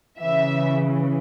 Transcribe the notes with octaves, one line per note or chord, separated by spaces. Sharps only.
C#3 E3 E5